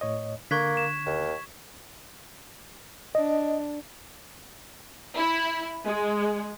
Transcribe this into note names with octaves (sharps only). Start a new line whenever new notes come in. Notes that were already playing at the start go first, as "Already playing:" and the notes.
A2 C#5 D#5
D3 A#3 C#6 F#6 G#6 B6
E7
D#2
D4 D#5
E4
G#3